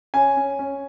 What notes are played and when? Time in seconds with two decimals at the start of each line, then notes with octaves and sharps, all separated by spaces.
0.14 C#4 G#5
0.37 C#4
0.59 C#4